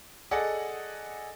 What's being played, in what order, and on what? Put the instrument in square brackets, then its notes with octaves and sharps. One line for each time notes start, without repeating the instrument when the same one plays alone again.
[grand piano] G#4 A4 D5 D#5 F#5